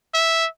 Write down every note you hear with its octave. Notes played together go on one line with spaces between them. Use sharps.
E5